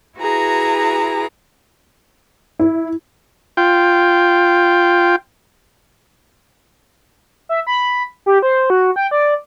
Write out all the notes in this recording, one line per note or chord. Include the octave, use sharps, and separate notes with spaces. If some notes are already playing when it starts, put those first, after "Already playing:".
E4 F#4 G#4 B4 A#5
E4
F4 G5
E5
B5
G4
C5
F#4
G5
D5